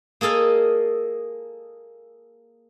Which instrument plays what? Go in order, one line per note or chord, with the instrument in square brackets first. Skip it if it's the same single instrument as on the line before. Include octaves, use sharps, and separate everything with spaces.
[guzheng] A#3 G#4 A4 D#5 F5